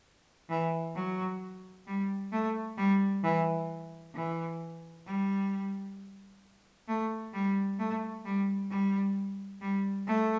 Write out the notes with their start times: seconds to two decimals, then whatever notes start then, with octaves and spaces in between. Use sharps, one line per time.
0.50 E3
0.95 F#3
1.87 G3
2.32 A3
2.77 G3
3.24 E3
4.15 E3
5.06 G3
6.88 A3
7.34 G3
7.79 A3
8.25 G3
8.71 G3
9.61 G3
10.07 A3